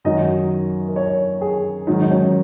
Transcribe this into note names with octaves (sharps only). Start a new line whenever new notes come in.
F#2 D#3 F#3 D#5
A#4
C#5
G#4
G#2 D#3 F#3 D#4
D#4
C#4